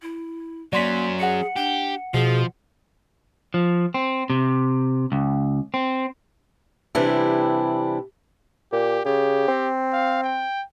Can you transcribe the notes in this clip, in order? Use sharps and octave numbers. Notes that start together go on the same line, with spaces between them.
E4
F#3 A#3 C#4 D5 C6 B6
G#4 F#5 C#7
D4 G4
B2 F3 G#4
F3
C4
C3
C#2
C4
C3 E3 G3 D4 E4
A#2 G4
C#3 G4
C4
F5
G5